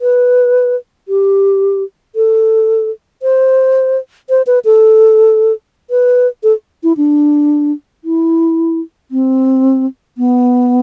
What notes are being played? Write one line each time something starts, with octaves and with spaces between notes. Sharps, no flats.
B4
G4
A4
C5
C5
B4
A4
B4
A4
E4
D4
E4
C4
B3